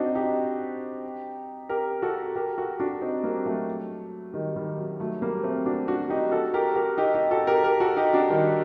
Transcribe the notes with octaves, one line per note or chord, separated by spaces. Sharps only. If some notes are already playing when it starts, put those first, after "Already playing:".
Already playing: C4 D4 D#4 F#4
D#4 G4
G4 A#4
F#4 A4
G4 A#4
F#4 A4
D4 F#4
C4 D#4
G3 A#3
F#3 A3
D#3 G3
D#3 G3
F#3
F#3 A3
G3 A#3
A3 C4
D4 F#4
D4 F#4
D#4 G4
F#4 A4
G4 A#4
G4 A#4
D#4 G4
D#4 G4
F#4 A4
G4 A#4
G4 A#4
F#4 A4
D#4 G4
D4 F#4
D#3 G3